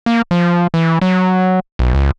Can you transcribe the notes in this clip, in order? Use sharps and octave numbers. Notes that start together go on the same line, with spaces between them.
A#3
F3
E3
F#3
B1
C#2